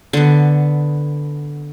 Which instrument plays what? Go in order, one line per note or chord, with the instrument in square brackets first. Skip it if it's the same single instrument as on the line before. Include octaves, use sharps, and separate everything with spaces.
[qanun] D3 B3